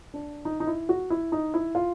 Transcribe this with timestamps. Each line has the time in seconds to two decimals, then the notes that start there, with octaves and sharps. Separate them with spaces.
0.14 D4
0.45 D#4
0.60 D#4
0.67 E4
0.89 F#4
1.10 E4
1.32 D#4
1.54 E4
1.75 F4